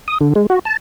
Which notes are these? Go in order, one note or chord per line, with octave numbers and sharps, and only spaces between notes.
D#6
D3
G#3
F#4
A5